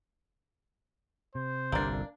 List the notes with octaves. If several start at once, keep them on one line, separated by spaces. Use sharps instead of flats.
C3 C5
G1 C2 A#3 D4